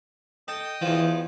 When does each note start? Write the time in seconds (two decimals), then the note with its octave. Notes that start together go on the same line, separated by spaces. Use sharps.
0.48 A4 D#5 G5 D#6
0.82 E2 E3 F3